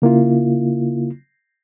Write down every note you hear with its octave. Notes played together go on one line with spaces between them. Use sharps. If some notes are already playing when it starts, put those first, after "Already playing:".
C#3 A#3 E4 F4